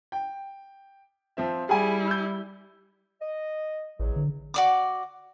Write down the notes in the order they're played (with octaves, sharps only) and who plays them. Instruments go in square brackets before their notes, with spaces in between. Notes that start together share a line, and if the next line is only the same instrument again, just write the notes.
[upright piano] G5
F3 C4 E5
[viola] G3 E4 [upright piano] G#4 G#5
[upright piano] E6 G6
[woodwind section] D#5
[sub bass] A1 [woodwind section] E2 F#3
[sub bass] D3
[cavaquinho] F#4 D5 D6